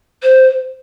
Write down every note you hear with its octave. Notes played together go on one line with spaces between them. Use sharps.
C5